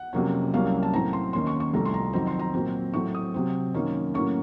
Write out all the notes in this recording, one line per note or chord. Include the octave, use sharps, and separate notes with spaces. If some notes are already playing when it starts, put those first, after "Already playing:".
Already playing: F#5
F2 C3 F#3 A#3 C#4
C2 C3 F#3 A#3 C#4 F5
A5
A2 F#3 C4 A#5
C6
D#2 D#3 A#3 C#4 C6
C#6
C#6
C2 C3 F3 A3 A#5
C6
A#5
F2 D#3 F#3 C4 A#5
C6
A#5
A#2 F#3 C4
A2 F#3 A3 C4 C#6
D#6
C3 F#3 C4
F#2 D#3 A#3 C#4
A2 F#3 A#3 C#4 C#6